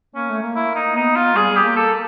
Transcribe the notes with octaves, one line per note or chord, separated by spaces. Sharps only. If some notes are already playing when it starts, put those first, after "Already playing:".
A#3 C#4
A3
A#3
E4
D#4
B3 D#4
F4
G3 G#4
G3
G4
A#3
A4